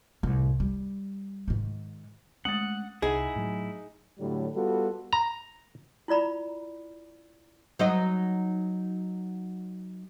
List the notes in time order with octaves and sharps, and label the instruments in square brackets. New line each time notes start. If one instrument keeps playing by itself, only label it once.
[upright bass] C2 A2
G3
G#2 D#3
[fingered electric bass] G#3 A3 C#4 [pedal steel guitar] F#5 [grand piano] D#6 A6
[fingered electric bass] C2 [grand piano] D#4 F#5 [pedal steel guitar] E4 [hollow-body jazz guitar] G#4
[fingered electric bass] A2 F#3
[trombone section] A2 D3 F#3 G3
G3 B3 F4 F#4 A4
[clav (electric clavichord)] A#5
[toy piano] E4 F4 D5 A#5 B5
[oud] F#3 D#4 D#5